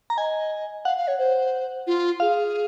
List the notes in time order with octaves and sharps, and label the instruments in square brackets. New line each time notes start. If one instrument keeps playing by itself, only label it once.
[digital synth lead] A#5
[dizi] D#5 [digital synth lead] G#5
[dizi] F5 [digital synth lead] F#5
[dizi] F5
C#5
C5
F4
[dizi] G#4 [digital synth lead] F5